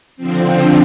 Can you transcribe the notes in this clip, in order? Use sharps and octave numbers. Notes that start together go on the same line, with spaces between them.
D3 F3 C4